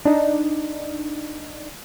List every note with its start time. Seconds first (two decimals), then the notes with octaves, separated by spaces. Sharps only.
0.05 D4 D#4